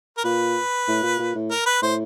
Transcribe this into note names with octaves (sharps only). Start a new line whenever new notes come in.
A#4
A#2 B4
A2
A#2
A#2
A2
A#4
B4
A2 C5